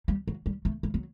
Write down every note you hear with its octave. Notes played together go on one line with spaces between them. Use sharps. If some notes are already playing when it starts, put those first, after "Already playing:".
G3
F#3
G3
A3
G3
F#3